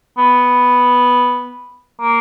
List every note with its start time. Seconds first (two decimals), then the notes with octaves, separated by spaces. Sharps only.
0.18 B3
2.01 A#3